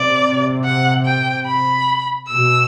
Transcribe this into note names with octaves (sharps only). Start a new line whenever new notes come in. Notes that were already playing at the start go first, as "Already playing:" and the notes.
Already playing: C3 D5
F#5
G5
B5
B2 E6